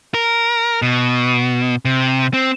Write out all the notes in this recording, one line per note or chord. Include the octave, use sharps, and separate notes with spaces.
A#4
B2
C3
C4